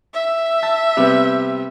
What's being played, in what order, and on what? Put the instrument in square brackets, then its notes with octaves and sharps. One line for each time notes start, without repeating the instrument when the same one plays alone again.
[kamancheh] E5
[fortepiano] A5
C3 G3 B3